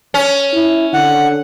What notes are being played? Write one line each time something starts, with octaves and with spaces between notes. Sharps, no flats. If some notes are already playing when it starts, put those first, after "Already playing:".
C#4
E4
D3 F#5